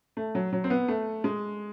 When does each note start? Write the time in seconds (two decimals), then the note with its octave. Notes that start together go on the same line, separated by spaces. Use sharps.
0.17 A3
0.35 F#3
0.53 F#3
0.64 C4
0.70 B3
0.88 A3
1.24 G#3